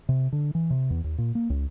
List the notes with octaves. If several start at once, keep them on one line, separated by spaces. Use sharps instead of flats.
C3
D3
E3
C3
E2
D#2
A#2
A#3
C#2